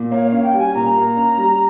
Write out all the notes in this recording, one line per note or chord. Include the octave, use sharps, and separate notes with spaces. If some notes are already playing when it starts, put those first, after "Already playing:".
Already playing: A#2
A#3 C#5
F5
C#4
G5
G3
G#5
A#2 A#5
A#3
C#4
G3